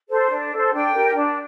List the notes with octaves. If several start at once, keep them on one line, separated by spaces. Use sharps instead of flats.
A4 C5
D4
A4 C5
D4 G5
G4 A#4
D4